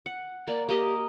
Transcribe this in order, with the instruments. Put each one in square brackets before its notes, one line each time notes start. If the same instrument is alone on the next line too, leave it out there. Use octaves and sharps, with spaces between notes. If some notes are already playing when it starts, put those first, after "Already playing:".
[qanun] F#5
[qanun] A#3 [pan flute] D5
[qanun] A#3 D#5 [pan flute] G4